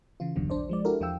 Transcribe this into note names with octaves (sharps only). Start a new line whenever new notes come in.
C#3 E3 F4
G1 E2 G2 B2 D3 F#3
A#1 D4 C5 D5
F3 G#3 D5
D4 E4 F#4 G4 A4 A#4
E2 F3 F4 G5 E6